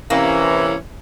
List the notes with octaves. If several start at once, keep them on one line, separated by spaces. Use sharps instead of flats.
C3 E3 A#3 C#4